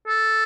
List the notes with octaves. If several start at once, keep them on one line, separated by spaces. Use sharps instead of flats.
A4